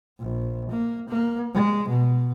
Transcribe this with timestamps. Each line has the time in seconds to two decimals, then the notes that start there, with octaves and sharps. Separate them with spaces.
0.19 A#1
0.70 A#3
1.09 A#3
1.54 G#3
1.89 B2